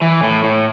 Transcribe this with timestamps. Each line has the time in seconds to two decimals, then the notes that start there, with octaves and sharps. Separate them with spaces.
0.02 E3
0.23 A2
0.44 A2